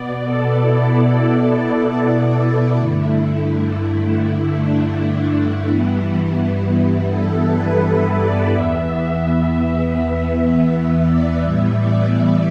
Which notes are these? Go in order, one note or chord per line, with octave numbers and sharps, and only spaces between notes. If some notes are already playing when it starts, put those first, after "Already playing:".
Already playing: B2 B3 D5
A4
E4
E4
E4
G2 D3 A3 E4
E4
E4
D4
G2 E3 G3 B3 E4
A4
B4
B4
D5
E2 E3 B3 E5
E5
E5
E5
D5
A2 E3 G3 B3 E5
D5